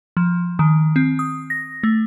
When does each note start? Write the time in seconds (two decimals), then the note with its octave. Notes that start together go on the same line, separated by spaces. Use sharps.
0.17 F3
0.59 D#3
0.96 C4
1.19 D#6
1.50 A#6
1.83 A3